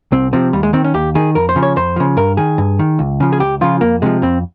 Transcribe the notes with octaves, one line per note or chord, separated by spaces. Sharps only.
C2 C4
C3 F3 C4
D#2 G3
G#3
D#3 C4
C#4
D#2 G4
D#3 G#4
F2 A#4
C5
C#3 F3
C#5
F2 C5
C#3 F3
G2 A#4
D#3 G#4
G2
D#3
C#2
C#3 F3
G#4
C#2 G4
C#3 F3 F4
F2 A#3
C3 F3 G#3
F2 C4